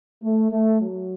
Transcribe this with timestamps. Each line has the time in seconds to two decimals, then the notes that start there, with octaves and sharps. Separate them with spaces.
0.22 A3
0.51 A3
0.79 F#3